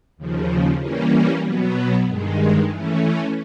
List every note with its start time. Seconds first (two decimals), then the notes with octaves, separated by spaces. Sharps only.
0.17 D#2 C#3 F3
0.80 E3 G3 A#3 C#4
1.43 B2 F#3 B3
2.07 G2 D#3 G#3
2.69 E3 A3 C#4